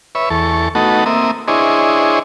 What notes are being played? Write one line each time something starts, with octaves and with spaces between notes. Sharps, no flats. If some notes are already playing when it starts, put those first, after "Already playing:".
B4 C#5 E5
E2 A4 C#6
A3 B3 D#4 F#4 A4
A#3 C4 E5 D#6
D4 E4 G#4 C5 C#5 D#5